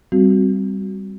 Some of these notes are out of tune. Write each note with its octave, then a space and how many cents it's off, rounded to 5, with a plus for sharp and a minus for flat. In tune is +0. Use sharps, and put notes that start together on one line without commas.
G3 +0 C4 +0 F#4 +0